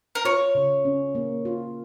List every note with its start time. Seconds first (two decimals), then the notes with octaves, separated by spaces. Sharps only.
0.15 A#4
0.25 F4 C#5
0.55 C#3
0.85 C#4
1.15 A#3
1.45 F4